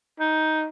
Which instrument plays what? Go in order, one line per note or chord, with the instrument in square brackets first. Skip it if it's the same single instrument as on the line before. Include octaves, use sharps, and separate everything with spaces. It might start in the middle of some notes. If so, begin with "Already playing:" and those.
[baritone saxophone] D#4